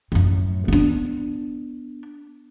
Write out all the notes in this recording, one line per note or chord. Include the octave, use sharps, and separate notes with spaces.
F#2 A2
B3 D4